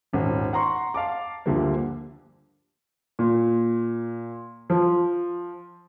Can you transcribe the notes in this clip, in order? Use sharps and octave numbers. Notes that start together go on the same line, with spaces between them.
D#1 G#1 C#4 F#5
F#5 A#5 C6 C#6
F5 A5 D6
D2 G2 D3 F3 G3 A#3
A#2
F3